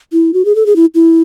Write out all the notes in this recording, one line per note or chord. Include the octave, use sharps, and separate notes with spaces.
E4
F#4
G#4
A4
G#4
E4
E4